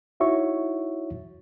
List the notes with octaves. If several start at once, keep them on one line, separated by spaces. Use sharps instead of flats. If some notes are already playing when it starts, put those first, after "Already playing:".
D#4 E4 F#4 C#5 E5 C#6